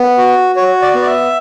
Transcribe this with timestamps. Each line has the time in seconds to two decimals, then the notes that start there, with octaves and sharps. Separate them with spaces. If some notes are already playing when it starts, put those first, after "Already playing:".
Already playing: B3
0.18 F#4
0.56 F#4 C#5
0.82 D5
0.94 B3
1.02 D5
1.07 E5